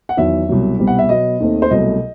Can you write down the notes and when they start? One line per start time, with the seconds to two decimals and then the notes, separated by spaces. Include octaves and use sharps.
0.09 F#5
0.17 E2 D#3 F#3 E5
0.49 C2 B2 F#3
0.79 C2 B2 G3 C4
0.87 F#5
0.99 E5
1.09 B2 F#3 B3 D#5
1.40 D#2 D#3 A3 C4
1.62 C5
1.71 C2 B2 F#3 A3 D#5